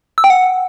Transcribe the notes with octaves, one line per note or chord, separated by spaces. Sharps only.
E6
G5
F#5